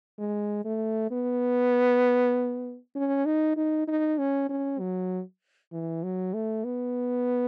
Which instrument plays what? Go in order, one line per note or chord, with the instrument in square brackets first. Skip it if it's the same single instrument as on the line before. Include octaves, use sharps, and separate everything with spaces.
[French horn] G#3
A3
B3
C#4
D#4
D#4
D#4
C#4
C#4
F#3
E3
F#3
A3
B3